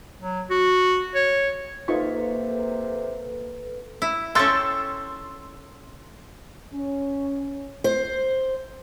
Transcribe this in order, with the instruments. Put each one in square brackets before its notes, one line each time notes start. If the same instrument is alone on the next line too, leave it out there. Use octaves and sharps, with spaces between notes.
[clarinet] F#3
F#4
C#5
[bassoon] C3 [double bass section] A#3 [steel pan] D#4 F4 C#6 [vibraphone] A4 B4
[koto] E4
[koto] C#4 A4 G5 [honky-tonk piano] C6 E6 A6
[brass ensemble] C#4
[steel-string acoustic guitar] C5